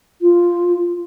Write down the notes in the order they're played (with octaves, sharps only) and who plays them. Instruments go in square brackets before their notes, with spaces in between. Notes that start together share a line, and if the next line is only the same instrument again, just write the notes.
[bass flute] F4